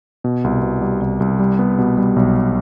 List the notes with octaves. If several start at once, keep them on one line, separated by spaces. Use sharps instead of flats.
B2
C2
B2
G3
C2
C2
G3
B3
B2
G3
B1